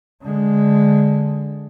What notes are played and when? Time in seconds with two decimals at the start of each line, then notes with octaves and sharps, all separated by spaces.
0.22 D3 G#3